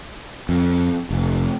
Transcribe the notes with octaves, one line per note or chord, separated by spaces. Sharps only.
F2
F1